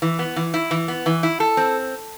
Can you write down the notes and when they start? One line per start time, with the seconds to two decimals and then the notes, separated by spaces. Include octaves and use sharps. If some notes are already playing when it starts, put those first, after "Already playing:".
0.02 E3
0.19 B3
0.36 E3
0.54 E4
0.71 E3
0.88 B3
1.06 E3
1.23 E4
1.40 A4
1.57 C4